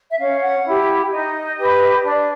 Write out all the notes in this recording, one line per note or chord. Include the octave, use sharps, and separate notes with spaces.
E5
C#4 F5
F#5
E4 G4
D#4 D#5
G4 B4
D4 D5